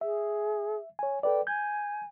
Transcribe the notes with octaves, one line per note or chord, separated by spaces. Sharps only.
G#4 E5
C#5 G#5
A4 B4 D5 G5
G#5 G6 G#6